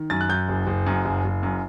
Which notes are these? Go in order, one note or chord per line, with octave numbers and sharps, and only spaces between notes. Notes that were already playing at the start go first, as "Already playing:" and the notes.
Already playing: D#3
F#2 A6
F#6
F#2 G6
F#1
F#1
F#2
F#1
F#1
F#2